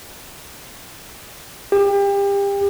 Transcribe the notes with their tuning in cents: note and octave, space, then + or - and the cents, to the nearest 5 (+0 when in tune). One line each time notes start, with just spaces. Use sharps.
G4 +30